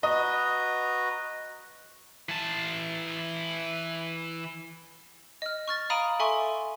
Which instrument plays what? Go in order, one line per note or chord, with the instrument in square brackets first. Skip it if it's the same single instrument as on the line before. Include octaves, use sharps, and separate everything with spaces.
[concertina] F#4 B4 A#5 [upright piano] D#5
[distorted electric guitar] E3 A5
[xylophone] D#5 F6
C#6 F6 A6
F5 A#5 B5 D#6 D7 D#7
A4 E5 G#5 C6 C#6